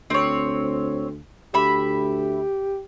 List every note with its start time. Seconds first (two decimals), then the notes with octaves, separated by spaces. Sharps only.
0.10 D2 C4 C#5
1.54 D2 G4 E5 B5